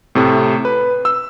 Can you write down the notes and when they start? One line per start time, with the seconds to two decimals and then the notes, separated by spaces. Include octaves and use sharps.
0.15 A2 C3 A3
0.65 B4
1.05 E6